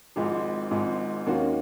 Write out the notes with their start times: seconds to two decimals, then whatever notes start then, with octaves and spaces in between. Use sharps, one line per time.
0.16 G#1 G#2 F3 G#3
0.71 G#1 G#2 F3 G#3
1.27 D#2 D#3 A#3 C#4 F#4